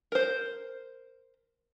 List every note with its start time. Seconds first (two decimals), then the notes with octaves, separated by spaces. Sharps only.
0.12 A#4 C5